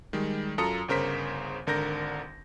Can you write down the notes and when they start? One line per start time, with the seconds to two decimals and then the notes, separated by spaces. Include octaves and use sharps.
0.13 D#3 G3 G#3
0.58 F#2 F4 A4 A#5 D#6 C#7
0.88 G1 C#3 A#4 C5 B6
1.67 G#1 D3 A#4 G6 A#6